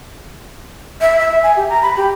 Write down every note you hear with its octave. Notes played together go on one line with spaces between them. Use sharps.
E5
E5
G#5
G4
A#5
B5
G4